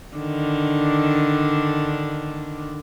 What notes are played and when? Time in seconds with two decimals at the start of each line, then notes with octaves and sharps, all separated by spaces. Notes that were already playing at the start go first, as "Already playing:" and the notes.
0.16 D3 D#3 D4